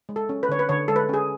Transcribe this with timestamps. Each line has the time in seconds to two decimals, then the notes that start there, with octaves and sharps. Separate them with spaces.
0.09 G#3
0.16 A4
0.29 C#4
0.43 B4
0.49 D3 C#5
0.59 B4
0.69 D3 C#5
0.88 G#3 A4
0.96 B4
1.09 C#4 G#4